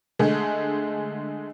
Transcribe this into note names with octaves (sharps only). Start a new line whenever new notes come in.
D3 G#3 A3 G#4